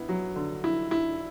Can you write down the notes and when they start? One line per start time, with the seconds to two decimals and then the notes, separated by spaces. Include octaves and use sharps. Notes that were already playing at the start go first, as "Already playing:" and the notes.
Already playing: B3 E4
0.09 F#3
0.36 D3
0.64 E4
0.91 E4